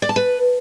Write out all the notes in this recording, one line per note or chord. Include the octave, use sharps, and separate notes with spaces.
D5
A5
B4